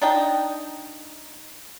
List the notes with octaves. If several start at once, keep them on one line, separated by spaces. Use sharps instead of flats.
D4 D#4 G5